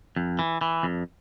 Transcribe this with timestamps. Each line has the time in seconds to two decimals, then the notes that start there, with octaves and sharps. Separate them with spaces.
0.16 F2
0.39 E3
0.61 E3
0.83 F2